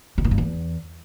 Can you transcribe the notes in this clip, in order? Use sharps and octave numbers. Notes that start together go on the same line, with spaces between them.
C3
A#2
G2
E2